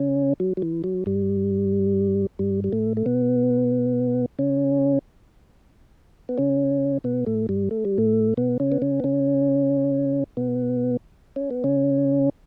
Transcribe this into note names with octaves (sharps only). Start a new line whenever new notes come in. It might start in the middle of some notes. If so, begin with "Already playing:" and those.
Already playing: C#3 C#4
F#3
F#3
E3
F#3
G2 G3
G2 G3
G3
A2 A3
A3
B2 B3
C#3 C#4
B3
C#3 C#4
B2 B3
A2 A3
G2 G3
A3
G3
A2 A3
B2 B3
C#3 C#4
B3
C#3 C#4
B3
C#3 C#4
B2 B3
C#4
B3
C#3 C#4